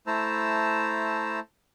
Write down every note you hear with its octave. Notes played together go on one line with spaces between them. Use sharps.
A3 E4 C5 A5 A#5 E6